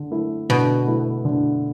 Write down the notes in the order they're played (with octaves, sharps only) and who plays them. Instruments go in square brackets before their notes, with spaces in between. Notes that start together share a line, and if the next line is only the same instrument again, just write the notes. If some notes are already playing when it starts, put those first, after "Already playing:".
Already playing: [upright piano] D3
A3 E4
[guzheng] B2 [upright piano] D3
[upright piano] A3 E4
D3